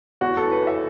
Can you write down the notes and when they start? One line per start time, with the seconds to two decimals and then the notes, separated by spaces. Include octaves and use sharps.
0.21 E2 F#4
0.37 E3 A4
0.52 B4
0.62 E3 E5